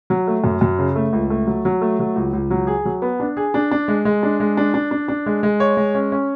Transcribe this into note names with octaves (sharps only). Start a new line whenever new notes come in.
F#3
A3
F#2
F#2
C#3
A3
C#2
A3
F#3
F#3
A3
F#3
C#2
C#2
F#3
G#4
F#3
B3
D4
G#4
D4
D4
G#3
G#3
D4
G#3
D4
D4
D4
D4
G#3
G#3
C#5
G#3
C#4
C#4